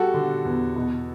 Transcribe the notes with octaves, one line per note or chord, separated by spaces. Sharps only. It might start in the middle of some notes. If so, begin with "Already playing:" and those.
Already playing: G3 F#4 A4
D3
E2
B2